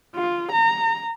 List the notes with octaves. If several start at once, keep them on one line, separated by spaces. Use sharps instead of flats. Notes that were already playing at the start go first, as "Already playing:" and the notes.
F4
A#5